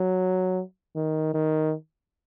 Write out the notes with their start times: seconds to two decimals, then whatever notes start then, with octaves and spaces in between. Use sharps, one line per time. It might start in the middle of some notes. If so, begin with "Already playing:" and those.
Already playing: F#3
0.96 D#3
1.34 D#3